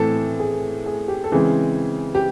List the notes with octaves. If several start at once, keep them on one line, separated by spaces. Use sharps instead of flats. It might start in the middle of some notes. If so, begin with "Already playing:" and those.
Already playing: A2 E3 A3 C4 A4
G#4
G#4
G4
A4
C#3 E3 G#3 C4 G#4
G4